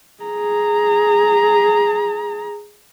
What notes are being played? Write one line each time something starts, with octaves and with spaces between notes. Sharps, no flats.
G#4 A#5